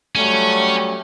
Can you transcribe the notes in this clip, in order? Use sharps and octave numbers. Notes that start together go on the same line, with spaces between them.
F#3 G3 A3 C#4